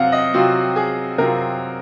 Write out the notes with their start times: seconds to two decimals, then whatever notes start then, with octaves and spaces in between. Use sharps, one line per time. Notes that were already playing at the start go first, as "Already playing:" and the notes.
Already playing: C3 F#3 C4 F5 F#5
0.12 D#5
0.34 C3 F#3 C4 F4 F#4
0.76 G#4
1.18 C3 F#3 C4 F4 A#4